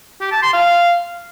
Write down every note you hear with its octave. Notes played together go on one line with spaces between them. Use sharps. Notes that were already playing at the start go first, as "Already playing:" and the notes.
G4
A5
C6
F5